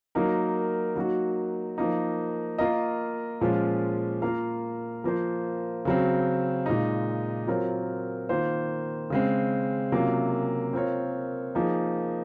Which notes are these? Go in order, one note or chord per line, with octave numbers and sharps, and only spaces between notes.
F#3 A#3 D#4 A#4
F#3 A#3 D#4 F#4
F3 A#3 D#4
A#3 F4 A#4 D#5
A#2 F3 G#3 C#4 F4
A#3 F4 A#4 F5
F3 A#3 F4 C5
C#3 F#3 C4
A#2 G#3 D#4
F#3 C4 F4 A#4 C#5
D#3 A#3 F4 C5
C#3 G#3 C4
C3 F#3 A#3 C#4 F4
C4 F4 A#4 C#5
F3 A#3 D#4 G#4